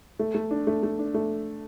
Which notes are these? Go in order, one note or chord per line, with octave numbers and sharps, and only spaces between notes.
A3
A3
D4
A3
A3
D4
A3